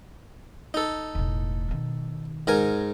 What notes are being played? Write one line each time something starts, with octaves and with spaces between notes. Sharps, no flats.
D#4 A4
E1 A2
B2 D#3
G#2 A#4 G#5